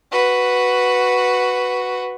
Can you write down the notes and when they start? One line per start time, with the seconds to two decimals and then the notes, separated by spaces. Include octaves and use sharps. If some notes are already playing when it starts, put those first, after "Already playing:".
0.12 F#4 B4